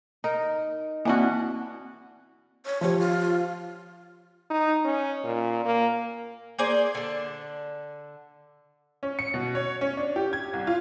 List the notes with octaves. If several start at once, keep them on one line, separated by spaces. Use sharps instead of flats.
D#4 A#4
E3 A#3 C4 D4 F#4
C#5
F3 G4 C#5
F4
D#4
C#4
A#2
A#3
A#3 G#4 C5 D5
D3 A5
C#4
C#7
B2
C#5
C#4
D4
G4
G#6
C2
F4